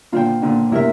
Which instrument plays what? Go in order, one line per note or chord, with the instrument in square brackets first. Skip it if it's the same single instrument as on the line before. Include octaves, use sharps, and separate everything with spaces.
[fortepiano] A#2 D3 [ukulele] F4 C5 G5
[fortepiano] A#2 D3
[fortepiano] A2 C3 [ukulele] E4 A#4 E5